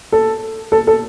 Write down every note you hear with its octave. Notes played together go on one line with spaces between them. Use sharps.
A4
A4
A4